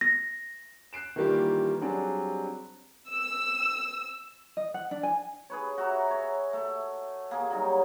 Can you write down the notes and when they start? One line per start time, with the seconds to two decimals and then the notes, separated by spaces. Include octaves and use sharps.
0.01 A#6
0.93 F#6 C7 D7 E7
1.16 D#3 E3 G3 A#3 F4 G4
1.81 F#3 G3 C4 D4 G#4
3.11 E6
4.57 D#5
4.74 F#5
4.91 D4
5.03 G#5
5.50 G#4 B4 C#5
5.78 F#4 E5 A#5
6.11 C#5
6.53 A3
7.31 A#3 G#4
7.50 F#3 G3 D#4